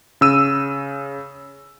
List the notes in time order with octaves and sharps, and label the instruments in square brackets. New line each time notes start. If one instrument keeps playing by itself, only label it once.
[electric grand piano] C#3 E6 D#7